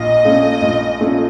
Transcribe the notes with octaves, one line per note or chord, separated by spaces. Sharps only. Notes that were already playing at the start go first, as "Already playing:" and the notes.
Already playing: A#1 A#2 F4 D#5
A#2 A3 C#4 F4
A#1
A#2 A3 C#4 F4